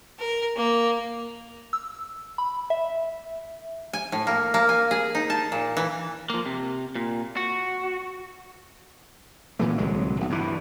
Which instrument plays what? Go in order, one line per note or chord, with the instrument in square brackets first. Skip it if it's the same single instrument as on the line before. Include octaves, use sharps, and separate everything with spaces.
[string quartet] A#4
A#3
[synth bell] E6
B5
E5
[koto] G#5
A2
A#3
A#3
G#5
G#4
D#4
A5
A#2
E3
[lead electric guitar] F3 A#3
C3
A#2
F#4
[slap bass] A#2 E3 A3
D1 C2 F#3 G#3
D#1 B1
G2 E3